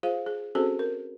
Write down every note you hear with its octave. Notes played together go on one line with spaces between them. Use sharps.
F4 G#4 C5 F5
G#4
C4 C#4 F#4 G#4 A4 C5
A#4